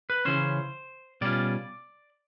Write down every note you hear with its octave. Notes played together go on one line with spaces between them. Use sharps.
B4
C#3 E3 C#4 C5
B2 G3 C#4 F4 D5